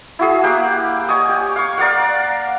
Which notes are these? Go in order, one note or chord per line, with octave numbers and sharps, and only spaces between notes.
E4 F#4 G#4
A#3 G4 F#5
C#5 D#5 G#5 D#6
G4
F5 C#6
A#4 D5 F5 F#5